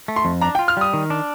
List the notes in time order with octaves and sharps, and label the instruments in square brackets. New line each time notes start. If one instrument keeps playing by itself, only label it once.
[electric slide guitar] A3
[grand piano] C6
[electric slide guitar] F2
[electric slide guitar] D4 [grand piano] A#5
[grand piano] G5
[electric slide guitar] F4
[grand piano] F6
[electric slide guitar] G3 [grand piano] D#6
[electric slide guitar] D#3
D4